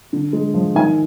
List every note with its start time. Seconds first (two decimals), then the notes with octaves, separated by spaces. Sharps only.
0.13 D3
0.33 G#3
0.54 F3
0.75 D#3 G#5